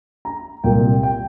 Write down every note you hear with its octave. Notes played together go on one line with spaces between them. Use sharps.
A#5
C2 A#2 A#3 G5
G5